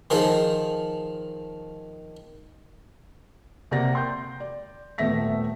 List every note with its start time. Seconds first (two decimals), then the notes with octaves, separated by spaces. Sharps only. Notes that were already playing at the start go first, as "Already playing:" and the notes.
0.10 D#3 F3 G#4
3.71 C3 A#3 D5 F#5 A6 A#6
3.93 G5 C6 G6
4.40 D5
4.98 D#1 A3 B3 E5 A#6 B6